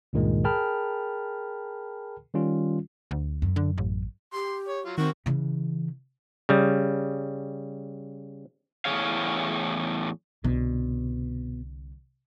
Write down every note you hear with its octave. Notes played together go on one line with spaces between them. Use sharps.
C#2 G2 A#2 D#3 G#3
G#4 A#4 G5 A5 B5 F6
D#3 G3 C#4 F4
D2
F#2
D3
A1
G4 C6
C#5
F#3 F4
D#3 A#3 C4 F#4 C#6
C#3 E3
C#3 G3
E2 A2 F3 G#4 C#5 F5
C2 B2 D3